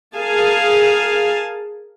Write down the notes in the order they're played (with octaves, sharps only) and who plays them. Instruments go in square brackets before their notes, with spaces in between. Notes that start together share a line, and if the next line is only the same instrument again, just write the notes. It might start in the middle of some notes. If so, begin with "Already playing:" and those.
[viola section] G#4 A#4 F5 G#5 A5